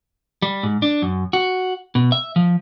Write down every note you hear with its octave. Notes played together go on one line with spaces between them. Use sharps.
G3
G#2
D4
F#2
F#4
B2
E5
F3